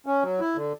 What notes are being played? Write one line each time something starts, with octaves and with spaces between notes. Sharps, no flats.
C#4
F#3
E4
D3